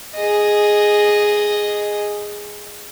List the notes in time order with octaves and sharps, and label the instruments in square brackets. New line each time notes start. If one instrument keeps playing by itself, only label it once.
[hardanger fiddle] G#4 D#5